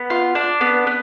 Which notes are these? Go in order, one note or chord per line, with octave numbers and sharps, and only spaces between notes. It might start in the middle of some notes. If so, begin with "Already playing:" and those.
Already playing: B3
F4
D4
B3
B3